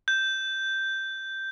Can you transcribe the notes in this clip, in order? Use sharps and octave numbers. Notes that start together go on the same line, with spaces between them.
G6